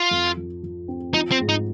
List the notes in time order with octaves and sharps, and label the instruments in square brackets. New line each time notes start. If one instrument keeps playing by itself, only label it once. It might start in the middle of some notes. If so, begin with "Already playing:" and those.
Already playing: [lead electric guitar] F4
[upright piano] F2
F3
F3
C4
[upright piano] F3 [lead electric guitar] D#4
[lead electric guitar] C4
[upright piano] G#2
[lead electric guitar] D#4